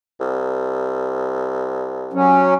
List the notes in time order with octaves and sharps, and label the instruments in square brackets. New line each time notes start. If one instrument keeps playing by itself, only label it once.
[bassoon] C2
[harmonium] F#3 C#4